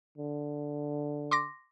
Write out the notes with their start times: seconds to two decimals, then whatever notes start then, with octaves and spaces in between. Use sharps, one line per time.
0.18 D3
1.31 C6 D6 A#6